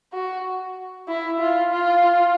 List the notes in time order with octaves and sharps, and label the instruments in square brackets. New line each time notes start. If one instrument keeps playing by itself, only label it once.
[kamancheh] F#4
E4
F4
F4